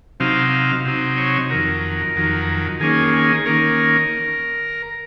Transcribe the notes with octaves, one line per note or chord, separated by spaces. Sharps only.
C3 F#3 C4 D#4 F5
F5
C3 F#3 C4 D#4
C#5
F2 D#3 F#3 A#4
F2 D#3 F#3
D#3 A#3 C#4 G#4
G#4
D#3 A#3 C#4 A#4